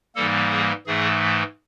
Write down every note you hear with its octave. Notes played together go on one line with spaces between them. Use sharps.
G#2 E3 G3 A#3 A4
G#4
G#2 E3 A3 G#4